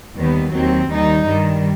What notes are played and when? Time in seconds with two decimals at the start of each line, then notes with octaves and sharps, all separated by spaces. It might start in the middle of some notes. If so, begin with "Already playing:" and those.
0.16 D#2 D#3 G3 B3
0.53 D#2 D#3 F#3 C4
0.90 D#2 D#3 G3 D#4
1.26 G2 D#3 G3